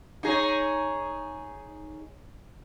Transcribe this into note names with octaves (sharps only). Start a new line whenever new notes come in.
D#4 G#4 C#5